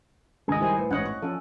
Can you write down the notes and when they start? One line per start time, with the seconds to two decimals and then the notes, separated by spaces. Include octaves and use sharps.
0.48 G#1 C#2 G#2 G#4 D#5
0.61 D#3 G3 E4 C5 G#5
0.78 A2 B4
0.91 A1 G#2 C#5 D#5 F#5 F#6
1.05 C#6
1.22 F3 C#4 A4